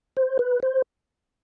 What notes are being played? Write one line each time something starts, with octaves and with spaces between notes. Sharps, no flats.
C5
B4
C5